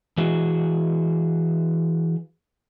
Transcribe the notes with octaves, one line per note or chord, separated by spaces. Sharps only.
E3 F#4 G#4